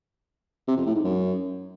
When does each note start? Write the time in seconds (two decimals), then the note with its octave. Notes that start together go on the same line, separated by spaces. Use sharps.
0.68 C3
0.77 F2
0.86 A2
0.95 G#2
1.04 F#2